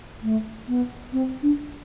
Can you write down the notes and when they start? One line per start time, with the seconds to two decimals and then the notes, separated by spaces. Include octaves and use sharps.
0.23 A3
0.68 B3
1.13 C4
1.42 D4